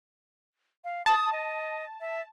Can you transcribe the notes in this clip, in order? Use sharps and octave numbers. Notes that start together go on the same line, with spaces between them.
F5
A5 D#6
D#5
E5